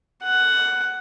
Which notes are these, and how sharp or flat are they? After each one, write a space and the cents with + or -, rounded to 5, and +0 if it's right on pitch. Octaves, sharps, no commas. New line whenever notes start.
F#5 +10